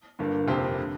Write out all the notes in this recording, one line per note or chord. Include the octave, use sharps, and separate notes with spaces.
G1 G2 D3 A#3
F1 F2 C3 A#3 G4 C5
D3